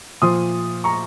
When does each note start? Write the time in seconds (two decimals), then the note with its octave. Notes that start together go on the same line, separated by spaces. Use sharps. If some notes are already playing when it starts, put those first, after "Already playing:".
0.22 A#2 F3 C6 D#6
0.84 A#5 C#6